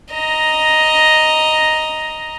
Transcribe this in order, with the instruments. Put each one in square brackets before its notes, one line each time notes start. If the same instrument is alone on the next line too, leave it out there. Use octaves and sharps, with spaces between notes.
[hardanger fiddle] D#5 A#5